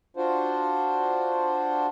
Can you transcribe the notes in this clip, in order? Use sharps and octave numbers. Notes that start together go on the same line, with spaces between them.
D4 F4 F#4 C5